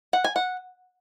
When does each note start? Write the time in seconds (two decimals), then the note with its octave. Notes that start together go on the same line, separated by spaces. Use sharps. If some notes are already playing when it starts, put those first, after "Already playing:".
0.13 F#5
0.24 G#5
0.36 F#5